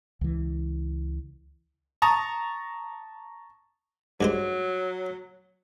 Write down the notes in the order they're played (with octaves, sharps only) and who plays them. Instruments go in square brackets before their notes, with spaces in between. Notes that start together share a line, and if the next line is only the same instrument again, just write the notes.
[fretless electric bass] C#2 E3
[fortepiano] A5 A#5 C#6 D#6
[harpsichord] G2 G#3 C5 [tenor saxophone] F#3